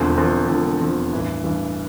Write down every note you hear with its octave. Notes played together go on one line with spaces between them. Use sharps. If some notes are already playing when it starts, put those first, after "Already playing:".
Already playing: E1 E2 D3 F3 C4
E1 E2 D3 F3 C4
E1 E2 D3 F3 C4
E1 E2 D3 F3 C4
A1 G2 E3
A1 G2 E3